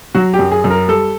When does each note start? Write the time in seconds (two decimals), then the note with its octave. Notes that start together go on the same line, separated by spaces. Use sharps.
0.15 F#3 F#4
0.34 G4
0.39 F#2
0.52 G#4
0.64 F#2
0.70 A#4
0.88 G3 A4